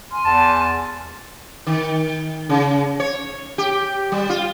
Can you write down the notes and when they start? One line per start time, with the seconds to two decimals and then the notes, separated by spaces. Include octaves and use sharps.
0.11 G#5 C6 F6
0.26 E2 A5
1.67 D#3
2.49 C#3
3.00 C#5
3.58 G4
4.12 G3
4.30 F4